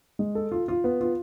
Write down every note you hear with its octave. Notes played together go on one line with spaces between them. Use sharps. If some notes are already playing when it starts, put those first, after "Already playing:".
G#3
A4
F4
F4
B3
F4